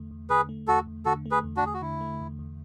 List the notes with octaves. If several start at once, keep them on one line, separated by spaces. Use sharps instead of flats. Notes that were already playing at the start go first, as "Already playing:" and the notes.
Already playing: E2 D3 A3
E2
D3 G#4 B4
A3
E2 F#4 A4
E2
D3 F#4 A4
A3
G#4 B4
E2
D4 F#4
E2 G#4
F#4
D3 E4
A3
E2
E2